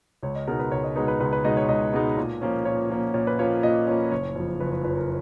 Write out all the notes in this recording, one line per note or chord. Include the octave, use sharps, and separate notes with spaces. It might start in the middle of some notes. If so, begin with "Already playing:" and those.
C#2 C#5
D#5
B2 G#3 D#4 A#4
B4
C#2 C#5
D#5
B2 G#3 D#4 B4
B4
C#2 B4
B4
B2 G#3 D#4 D#5
C#5
C#2 D#5
B2 G#3 D#4
A#2
F3 A#3 C#4
A#2 C#5
F3 A#3 C#4
A#2 C#5
B4
F3 A#3 C#4 C#5
A#2 D#5
F3 A#3 C#4
F#1 C#5
F2 F3
F#1 B4
B4
F2 F3 B4
A#4